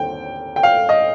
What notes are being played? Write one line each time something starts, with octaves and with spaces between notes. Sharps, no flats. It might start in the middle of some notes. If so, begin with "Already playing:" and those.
Already playing: D#2 D3 C4 G5
G5
F5
D#5